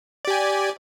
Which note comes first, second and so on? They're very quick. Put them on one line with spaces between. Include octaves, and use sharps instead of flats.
D5 G4 G#5